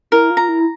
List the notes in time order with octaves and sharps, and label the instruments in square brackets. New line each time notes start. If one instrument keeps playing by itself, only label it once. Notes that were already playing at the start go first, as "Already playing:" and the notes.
[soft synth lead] E4 [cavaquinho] A#4
[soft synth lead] F4
[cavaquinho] A#5
[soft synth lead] E4